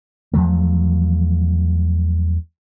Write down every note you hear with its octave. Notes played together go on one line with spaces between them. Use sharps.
E2 F3 F#3 A3